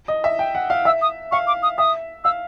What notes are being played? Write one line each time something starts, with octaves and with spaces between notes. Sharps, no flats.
D#5
E5
G5
F#5
F5
E5 E6
D#6
F5 C#6
D6
D#6
E5 D#6
F5 E6